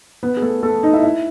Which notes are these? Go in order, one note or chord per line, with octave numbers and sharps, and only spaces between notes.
B3 B4
G#4
A3 A4
A3 A4
D#4 D#5
E4 E5
E4 E5